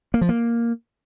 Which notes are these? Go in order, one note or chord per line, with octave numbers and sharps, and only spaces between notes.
A#3
F3
A#3